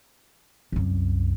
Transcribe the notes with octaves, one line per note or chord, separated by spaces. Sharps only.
C2 F#2